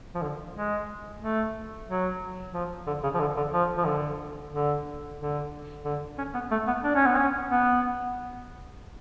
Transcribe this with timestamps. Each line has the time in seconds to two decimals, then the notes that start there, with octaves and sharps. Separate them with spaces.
0.15 F3
0.22 D3
0.56 G#3
1.22 A3
1.88 F#3
2.54 F3
2.87 D3
3.03 C#3
3.14 F3
3.20 D3
3.37 D3
3.53 F3
3.78 F3
3.86 D3
4.53 D3
5.19 D3
5.85 D3
6.18 C#4
6.34 B3
6.51 A3
6.67 B3
6.83 D4
6.95 C#4
7.06 B3
7.17 C#4
7.50 B3